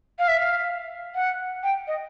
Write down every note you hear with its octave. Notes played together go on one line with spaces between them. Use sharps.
F5
E5
F5
F#5
G5
D#5